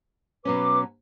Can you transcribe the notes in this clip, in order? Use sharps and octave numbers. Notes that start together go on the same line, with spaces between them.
B2 F#3 C#4 B4 D6